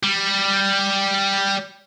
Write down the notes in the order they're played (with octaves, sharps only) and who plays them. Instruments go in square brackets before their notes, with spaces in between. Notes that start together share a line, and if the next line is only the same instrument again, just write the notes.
[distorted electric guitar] G3